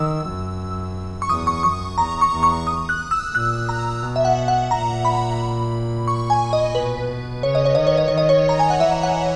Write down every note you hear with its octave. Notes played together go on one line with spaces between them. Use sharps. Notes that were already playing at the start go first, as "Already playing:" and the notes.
Already playing: D#3 E6
F#2
C#6
E2 D#6
C#6
F#2 C#6
E2 A#5
C#6
E2
C#6
D#6
F#6
E6
A#2 F#6
A#5
B2
E5
F#5
F#5
A#2 A#5
B5
C#6
G#5
D#5
B2 B4
C#3 C#5
D#5
C#5
D#3 D#5
C#5
D#5
D#3 C#5
D#5
C#5
A#5
G#5
F#5
E3 E5
F#5